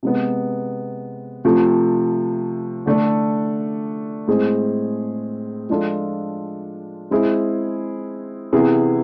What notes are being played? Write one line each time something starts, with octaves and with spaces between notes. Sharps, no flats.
C3 G#3 B3
C3 F3 A3
D3 A3 D4 A4
A2 G#3 C4 G#4
F3 G#3 D4 F4 A4
G#3 C4 E4 G#4
C3 E3 B3 E4 G#4